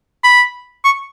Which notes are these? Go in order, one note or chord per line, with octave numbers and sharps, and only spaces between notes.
B5
C#6